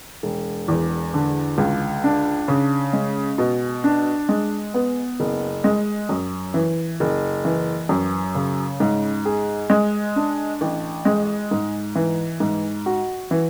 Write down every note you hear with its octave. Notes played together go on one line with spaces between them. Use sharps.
E1
E2
D3
C#2
D4
C#3
G#3
B2
D4
G#3
B3
F#1
G#3
F#2
E3
F#1
E3
F#2
C#3
G#2
G#4
G#3
D4
A1
G#3
G#2
E3
G#2
F#4
E3